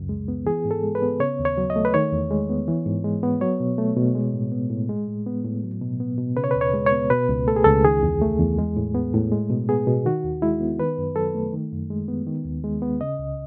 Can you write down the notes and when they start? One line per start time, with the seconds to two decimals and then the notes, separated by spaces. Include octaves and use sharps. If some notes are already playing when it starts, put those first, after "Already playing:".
Already playing: C#2 F#2 C#3
0.09 G#3
0.28 B3
0.46 E3 G#4
0.65 G#2
0.71 A4
0.83 G#3
0.95 B4
1.02 B3
1.20 C#3 C#5
1.39 D#2
1.45 C#5
1.58 F#3
1.70 D#5
1.76 A3
1.85 B4
1.94 D#3 C#5
2.12 E2
2.31 G#3
2.49 B3
2.68 E3
2.86 G#2
3.05 G#3
3.23 B3
3.41 F#3 C#5
3.60 B2
3.78 A3
3.97 B2
4.15 G#3
4.34 A2
4.52 B3
4.70 A2
4.89 G#3
5.08 A2
5.26 B3
5.45 A2
5.63 F#3
5.81 B2
6.00 B3
6.18 B2
6.37 C#3 B4
6.44 C#5
6.51 B4
6.56 D#2
6.61 C#5
6.74 G#3
6.86 C#5
6.92 B3
7.10 B2 B4
7.29 C#2
7.47 A3 A4
7.56 G#4
7.64 C#2 A4
7.84 D#3 G#4
8.03 E2
8.22 A3
8.39 E2
8.58 G#3
8.77 A2
8.94 B3
9.14 A2
9.32 G#3
9.50 B2
9.68 B3 G#4
9.87 B2
10.06 D#3 F#4
10.24 D#2
10.42 G#3 E4
10.61 B3
10.80 D#3 B4
10.98 F#2
11.16 F#3 A4
11.35 A3
11.53 D#3
11.72 F#2
11.90 G#3
12.08 B3
12.27 D#3
12.45 D#2
12.64 G#3
12.82 B3
13.01 C#3 D#5
13.19 C#2